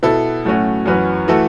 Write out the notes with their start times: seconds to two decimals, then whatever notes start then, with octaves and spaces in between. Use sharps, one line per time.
0.03 B2 B3 E4 A4
0.45 A2 F#3 A3 C#4 F#4
0.86 F#2 E3 C#4 F#4 B4
1.28 E3 A3 F#4 A4